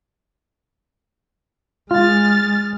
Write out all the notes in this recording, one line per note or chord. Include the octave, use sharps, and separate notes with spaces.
G#3 F4 F6 A6